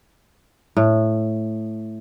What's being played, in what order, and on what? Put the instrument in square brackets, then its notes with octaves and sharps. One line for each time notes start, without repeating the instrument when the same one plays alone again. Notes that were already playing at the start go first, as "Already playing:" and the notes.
[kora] A2